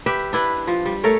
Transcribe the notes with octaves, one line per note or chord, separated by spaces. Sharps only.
G4 B4 E5
D4 E4 B4
F3
G3
A3 A4 A#4 C#5